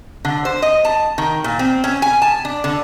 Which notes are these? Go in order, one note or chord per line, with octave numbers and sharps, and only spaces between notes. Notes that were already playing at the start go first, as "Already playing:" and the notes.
D3
C5
D#5
A5
D#3
A#2
C4
C#4
G#5
A5
D4
D3